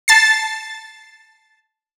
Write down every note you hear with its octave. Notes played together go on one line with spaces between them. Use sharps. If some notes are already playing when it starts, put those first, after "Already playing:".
A5 A6 C7